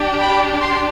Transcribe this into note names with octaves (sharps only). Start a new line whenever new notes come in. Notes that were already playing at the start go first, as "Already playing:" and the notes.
Already playing: D4 G4
G5 B5
C6